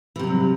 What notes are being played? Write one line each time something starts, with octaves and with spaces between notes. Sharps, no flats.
G2 C3 E3 F#3